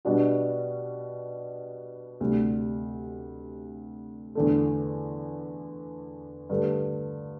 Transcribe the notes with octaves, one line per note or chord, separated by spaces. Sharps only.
B2 G3 D4 F#4
D2 C3 G3
E2 D3 A3
G2 D3 A3